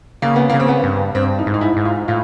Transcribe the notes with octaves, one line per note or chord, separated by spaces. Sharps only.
C#3 A#3
B3
A#3
C#3
C4
B3
G2
G2 C4
D#4
G#2
D#4
E4
G#2
F4
A2 F4